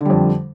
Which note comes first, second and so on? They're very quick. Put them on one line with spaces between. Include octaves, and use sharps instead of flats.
D3 G3 F2